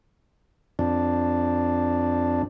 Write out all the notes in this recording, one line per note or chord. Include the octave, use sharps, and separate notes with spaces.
F2 D4